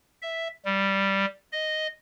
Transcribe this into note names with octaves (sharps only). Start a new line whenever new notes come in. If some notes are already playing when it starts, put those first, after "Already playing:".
E5
G3
D#5